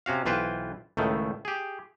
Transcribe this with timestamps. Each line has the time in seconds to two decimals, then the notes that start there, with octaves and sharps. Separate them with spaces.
0.06 C3 C#4 F#4 F5
0.25 B1 E3 F4 B4 C5 G5
0.97 C#2 A2 D#3 A3
1.45 G4 G#4